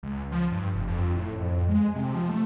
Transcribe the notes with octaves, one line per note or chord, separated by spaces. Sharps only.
C#2
F3
G2
F1
F2
A2
F2
G#3
C3
F3
A3